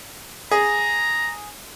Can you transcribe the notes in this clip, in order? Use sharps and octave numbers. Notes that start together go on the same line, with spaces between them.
G#4 A#5